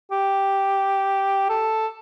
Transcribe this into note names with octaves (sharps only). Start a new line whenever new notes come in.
G4
A4